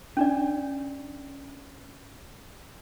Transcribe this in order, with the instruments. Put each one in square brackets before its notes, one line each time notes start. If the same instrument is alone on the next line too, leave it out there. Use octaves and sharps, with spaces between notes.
[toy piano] C#4 D4 D5